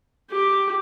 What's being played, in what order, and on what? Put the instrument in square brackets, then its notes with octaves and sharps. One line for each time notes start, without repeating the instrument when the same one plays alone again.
[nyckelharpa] G4